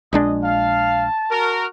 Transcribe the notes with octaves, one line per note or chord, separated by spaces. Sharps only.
A#1 G#3 D4 D#5
F5 A5
F#4 A#4